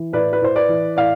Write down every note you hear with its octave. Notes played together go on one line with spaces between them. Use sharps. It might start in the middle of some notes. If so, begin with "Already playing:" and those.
Already playing: E3
A2 B4 D5
B4
A2 C5
B4 D5
E3
A2 D5 F5